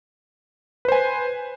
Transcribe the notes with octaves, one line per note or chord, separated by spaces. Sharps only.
B4 C5 G#5